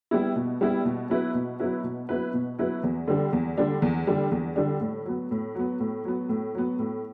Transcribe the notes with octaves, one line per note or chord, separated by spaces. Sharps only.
G3 B3 E4
B2
G3 B3 E4
B2
F#3 B3 E4 B4
B2
F#3 B3 E4 B4
B2
F#3 B3 E4 B4
B2
F#3 B3 E4 B4
E2
D3 G3 D4
E2
D3 G3 D4
E2
D3 G3 D4
E2
D3 G3 D4
A2
F#3 B3
A2
F#3 B3
A2
F#3 B3
A2
F#3 B3
A2